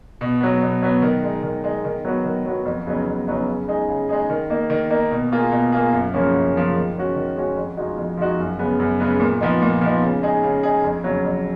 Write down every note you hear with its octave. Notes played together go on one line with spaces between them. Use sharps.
B2
F#3 B3
B2
F#3 B3
D#3
G#3 D#4
D#3
G#3 D#4
D#3
F#3 B3 F#4
D#3
F#3 B3 F#4
F2
C#3 F#3 B3 D#4
F2
C#3 F#3 B3 D#4
C#3
G#3 D#4 G#4
C#3
G#3 D#4 G#4
D#3
A#3 D#4
D#3
A#3 D#4
B2
A#3 F4 G#4
B2
A#3 F4 G#4
F#2
C#3 F3 A#3 C#4
F#2
C#3 F3 A#3 C#4
D#3
G#3 C#4 F#4
D#3
G#3 C#4 F#4
F2
F3 G#3 D#4 F#4
F2
F3 G#3 D#4 F#4
F#2
C#3 G#3 B3
F#2
C#3 G#3 B3
A#2
F3 B3 D#4
A#2
F3 B3 D#4
C#3
G#3 D#4 G#4
C#3
G#3 D#4 G#4
F2
C#3 F#3
F2